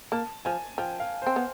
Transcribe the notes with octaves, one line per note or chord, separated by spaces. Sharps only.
A#3 A5
F3 G#5
F3 G5
F5
C4 C5
B3